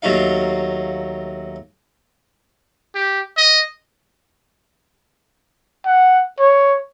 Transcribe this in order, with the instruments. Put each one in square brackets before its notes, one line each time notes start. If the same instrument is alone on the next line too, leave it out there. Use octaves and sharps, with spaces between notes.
[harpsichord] D#2 F#3 A3 D#4 F5
[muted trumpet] G4
D#5
[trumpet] F#5
C#5